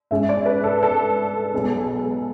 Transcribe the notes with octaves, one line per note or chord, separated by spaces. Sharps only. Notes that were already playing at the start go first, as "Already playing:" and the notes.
G#2 G#3 C#4 E5
D5
B4
A4
A4
B1 B2 G#3 B3